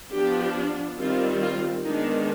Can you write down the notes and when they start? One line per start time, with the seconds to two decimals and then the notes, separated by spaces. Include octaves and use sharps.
0.14 F3 B3 D4 G4
0.99 D#3 G3 C4 F4
1.43 F4
1.85 D#3 G#3 B3 D4 D#4